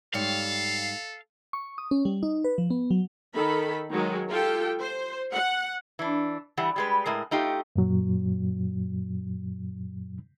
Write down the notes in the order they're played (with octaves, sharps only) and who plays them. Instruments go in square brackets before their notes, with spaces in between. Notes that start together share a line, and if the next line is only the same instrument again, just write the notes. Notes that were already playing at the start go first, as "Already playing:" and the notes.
[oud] G#2 G3 C#5 [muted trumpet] A4 [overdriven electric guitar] F5
[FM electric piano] C#6
D#6
C#4
G3
D#4
B4
F3
B3
F#3
[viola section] D#3 A4 B5
D#3 F#3 G#3
F4 G4 A4 G5
C5
F#5
[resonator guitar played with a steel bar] E3 D4
E3 G3 F#5
G3 G#3 B4
A2 G#3 A#4
A3 D#4 F4 G4
[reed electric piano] F#2 A#2 F#3